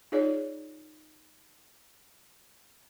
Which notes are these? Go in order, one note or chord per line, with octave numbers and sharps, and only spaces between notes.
D#4 F4 G#4 C#5 D5